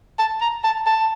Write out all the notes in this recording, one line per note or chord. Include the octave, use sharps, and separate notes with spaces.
A5
A#5
A5
A5